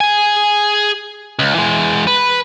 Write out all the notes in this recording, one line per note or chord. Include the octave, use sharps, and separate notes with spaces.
G#4 G#5
C#2
E3 G#3
B4